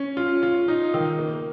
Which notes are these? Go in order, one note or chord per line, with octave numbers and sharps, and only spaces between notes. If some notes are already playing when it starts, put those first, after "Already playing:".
Already playing: C#4
F4
F4
D#4
D#3
A#3